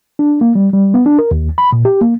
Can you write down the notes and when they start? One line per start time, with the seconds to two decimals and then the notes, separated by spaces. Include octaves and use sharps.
0.19 D4
0.41 A#3
0.55 G3
0.73 G3
0.94 B3
1.06 D4
1.19 A#4
1.31 D#2
1.58 B5
1.72 A#2
1.85 G4
2.01 A#3